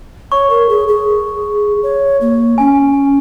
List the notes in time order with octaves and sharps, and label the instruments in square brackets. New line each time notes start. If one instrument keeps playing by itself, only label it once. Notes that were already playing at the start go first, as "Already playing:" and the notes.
[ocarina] C#5 [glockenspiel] C#6
[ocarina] A#4
G#4
G#4
C#5
A#3
[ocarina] C#4 [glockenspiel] G#5